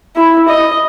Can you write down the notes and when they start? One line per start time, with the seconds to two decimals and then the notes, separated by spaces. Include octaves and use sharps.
0.16 E4
0.48 D#5